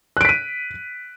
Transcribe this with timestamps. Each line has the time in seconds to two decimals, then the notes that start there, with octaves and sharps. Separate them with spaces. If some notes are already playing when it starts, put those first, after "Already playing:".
0.17 F#6
0.21 D7
0.25 B6
0.29 D#7